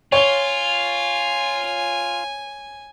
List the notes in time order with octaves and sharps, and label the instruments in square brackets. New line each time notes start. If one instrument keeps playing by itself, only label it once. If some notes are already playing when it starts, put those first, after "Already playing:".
[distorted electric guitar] F4 [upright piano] C#5 G7 [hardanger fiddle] G#5